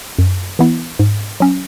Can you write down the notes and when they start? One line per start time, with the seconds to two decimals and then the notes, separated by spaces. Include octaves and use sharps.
0.19 F#2
0.59 E3 B3 E4
0.99 G#2
1.40 F#3 C#4